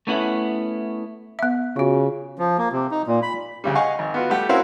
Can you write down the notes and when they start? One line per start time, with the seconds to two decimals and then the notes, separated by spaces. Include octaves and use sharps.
0.07 A3 B3 C#4 E4 F#5
1.39 B3 E5
1.76 C#3 F4 F#4
2.39 F3
2.58 A#3
2.72 C3
2.91 D#4
3.07 A#2
3.22 B5
3.64 D2 C#3 G3
3.75 D#5 F5 F#5 G#5 C#6
3.99 G#1
4.14 B3 F4 F#4
4.30 G3 A3 G4 F#5
4.49 C4 C#4 E4 F#4 A#4 F5